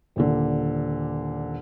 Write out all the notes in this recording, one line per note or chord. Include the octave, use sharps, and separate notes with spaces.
D#1 A#2 D3